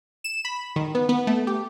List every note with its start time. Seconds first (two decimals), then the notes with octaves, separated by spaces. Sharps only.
0.24 E7
0.45 B5
0.76 D#3
0.95 B3
1.09 B3
1.27 A3
1.47 G4